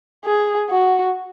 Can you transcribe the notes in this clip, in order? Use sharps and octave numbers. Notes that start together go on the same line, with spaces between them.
G#4
F#4